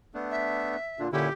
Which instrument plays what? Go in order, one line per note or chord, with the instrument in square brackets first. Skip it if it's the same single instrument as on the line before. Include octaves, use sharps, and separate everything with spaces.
[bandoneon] A3 B3 D4
[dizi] E5
[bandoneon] A#2 D3 D4 [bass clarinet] F4
[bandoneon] A#2 C#4 E4 [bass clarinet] D3 [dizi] G4